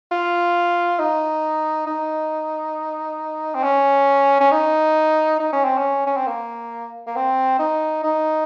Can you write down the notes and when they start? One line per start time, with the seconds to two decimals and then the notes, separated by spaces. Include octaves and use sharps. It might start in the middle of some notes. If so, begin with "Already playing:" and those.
0.11 F4
0.99 D#4
1.87 D#4
3.55 C4
3.63 C#4
4.40 C#4
4.51 D#4
5.39 D#4
5.53 C#4
5.65 C4
5.78 C#4
6.07 C#4
6.17 C4
6.27 A#3
7.07 A#3
7.16 C4
7.59 D#4
8.04 D#4